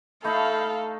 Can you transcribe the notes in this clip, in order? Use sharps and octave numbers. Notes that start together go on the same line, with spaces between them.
A3 D#4 A4 F5 B5